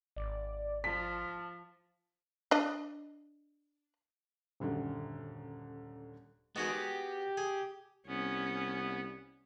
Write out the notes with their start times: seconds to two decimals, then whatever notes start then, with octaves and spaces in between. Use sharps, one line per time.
0.16 G#1 D5
0.84 F3 A5 B6
2.51 D4 D#5
4.60 D#1 F#2 D3
6.56 D#3 G#3 B3 F#4 G#4
6.69 G4
7.37 G#4
8.07 C2 B3 C#4